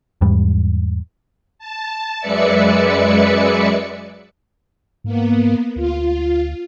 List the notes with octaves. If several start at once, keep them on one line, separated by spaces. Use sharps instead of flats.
E2 G#2 G3
A5
F#2 G#3 B4 D5 E5 C#7
G#2 A#3 B3
D2 F4